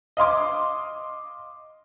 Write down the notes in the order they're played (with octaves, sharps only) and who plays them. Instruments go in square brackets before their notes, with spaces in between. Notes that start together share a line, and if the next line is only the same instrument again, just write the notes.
[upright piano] D#5 F5 C6 D6